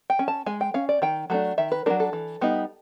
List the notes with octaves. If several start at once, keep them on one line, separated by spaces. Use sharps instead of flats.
G5
C#4
A5
G#3 G#5
G5
C#4 F5
D5
D#3 G5
F#3 A3 D4
D#3 E5
B4
F#3 A3 D4 A#4
A4
E3
G3 B3 D#4